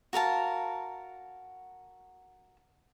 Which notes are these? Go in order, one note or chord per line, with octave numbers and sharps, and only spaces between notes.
F#4 A#4 F5 A5